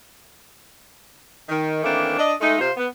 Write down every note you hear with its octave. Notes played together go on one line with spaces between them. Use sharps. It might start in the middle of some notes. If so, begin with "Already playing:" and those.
D#3
D#3 E3 A3 A#3 C4 D4
D4 D#5
G#3 A3 D#4
C3 F4 C5
B3